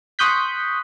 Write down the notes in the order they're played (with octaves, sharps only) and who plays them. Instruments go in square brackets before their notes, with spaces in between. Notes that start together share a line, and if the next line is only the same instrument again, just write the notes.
[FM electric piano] C6 C#6 D#6 F#6 G6 B6